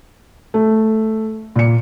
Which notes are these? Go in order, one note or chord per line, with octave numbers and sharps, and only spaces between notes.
A3
A#2 C#7